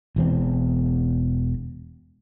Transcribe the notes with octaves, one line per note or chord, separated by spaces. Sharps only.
E1 E2 C4